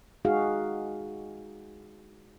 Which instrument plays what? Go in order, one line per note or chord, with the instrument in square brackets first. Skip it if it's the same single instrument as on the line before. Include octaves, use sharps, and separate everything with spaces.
[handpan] G#3 D#4 F#4 G#4 F5